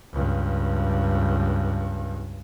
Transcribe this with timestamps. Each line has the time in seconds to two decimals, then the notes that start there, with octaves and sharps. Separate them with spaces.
0.13 C#2 G2